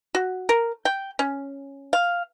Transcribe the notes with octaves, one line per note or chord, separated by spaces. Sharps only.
F#4
A#4
G5
C#4
F5